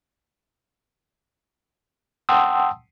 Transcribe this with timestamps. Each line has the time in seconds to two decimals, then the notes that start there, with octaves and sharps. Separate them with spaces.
2.29 F#5 G5 A5 C6 D#6 E6